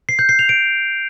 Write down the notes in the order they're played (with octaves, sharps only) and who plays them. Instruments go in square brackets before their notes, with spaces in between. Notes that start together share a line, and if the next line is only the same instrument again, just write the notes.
[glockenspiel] C7
G6
C7
F7
D7